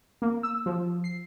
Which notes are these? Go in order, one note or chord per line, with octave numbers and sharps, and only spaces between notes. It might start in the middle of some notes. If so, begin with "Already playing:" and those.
A#3
E6
F3
C7